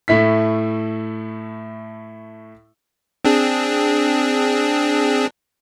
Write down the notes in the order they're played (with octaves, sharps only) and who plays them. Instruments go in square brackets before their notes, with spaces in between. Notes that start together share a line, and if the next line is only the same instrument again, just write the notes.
[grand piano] A2 A3 E4 B6
[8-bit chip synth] C4 D4 G#4